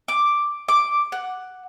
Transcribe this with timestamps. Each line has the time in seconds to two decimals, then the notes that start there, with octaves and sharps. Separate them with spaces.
0.08 D6
0.68 D6
1.12 F#5